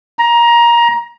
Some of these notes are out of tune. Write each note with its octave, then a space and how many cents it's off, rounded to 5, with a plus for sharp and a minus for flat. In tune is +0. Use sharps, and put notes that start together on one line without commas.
A#5 +20